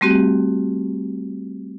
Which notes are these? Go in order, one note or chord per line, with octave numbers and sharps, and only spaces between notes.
G3 A3 C4 F#4 G4